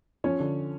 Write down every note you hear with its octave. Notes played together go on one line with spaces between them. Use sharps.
F3 C#4 C#5
D3